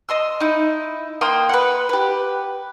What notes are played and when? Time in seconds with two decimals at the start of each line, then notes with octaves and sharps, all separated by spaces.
0.09 D#5 C6 E6
0.40 D#4 E4
1.21 A#3 G5 C6 D#6
1.49 B4 F#5
1.89 G4 B4